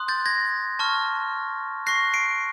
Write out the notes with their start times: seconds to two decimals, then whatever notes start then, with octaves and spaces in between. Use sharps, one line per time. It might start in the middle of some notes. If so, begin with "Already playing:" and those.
Already playing: C6 D#6 F#6
0.08 G6 A6
0.26 G#6 A#6
0.79 A5 C#6 F6
1.86 C#6 F#6 A#6 C7
2.14 C7 D7